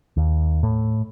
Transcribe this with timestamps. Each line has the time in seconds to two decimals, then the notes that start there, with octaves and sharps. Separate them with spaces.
0.17 D#2
0.63 A2